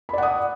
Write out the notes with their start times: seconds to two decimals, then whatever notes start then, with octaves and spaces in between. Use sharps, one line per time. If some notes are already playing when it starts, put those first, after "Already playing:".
0.09 B5
0.13 D5
0.18 F#5
0.22 D#6